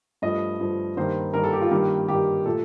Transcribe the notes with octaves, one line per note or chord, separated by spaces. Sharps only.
G2 F3 A3 D#5
G2 F3 A3
G2 D#3 G3 A#3 C5
G2 D#3 G3 A#3 A#4
A4
G4
F4
G2 D#3 A#3 G4
G2 D#3 A#3 G4
A#2 A3 A4